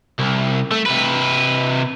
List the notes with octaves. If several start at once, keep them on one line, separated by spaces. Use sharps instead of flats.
C2
A3
C3 B4